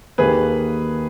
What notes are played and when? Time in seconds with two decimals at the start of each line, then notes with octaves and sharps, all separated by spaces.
0.18 D#2 D#3 A#3 G#4 B4